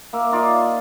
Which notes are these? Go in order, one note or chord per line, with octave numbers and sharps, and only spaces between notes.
A#3 E5
D#4 F4 D5 D#5